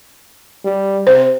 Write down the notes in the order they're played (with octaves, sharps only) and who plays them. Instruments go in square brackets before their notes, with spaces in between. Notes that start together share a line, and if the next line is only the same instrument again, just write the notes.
[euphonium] G3
[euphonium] C3 [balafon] C5